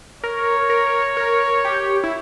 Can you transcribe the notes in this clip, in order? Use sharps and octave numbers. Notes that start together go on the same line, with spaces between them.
A#4 C#5
A#4
A#4
G4
E4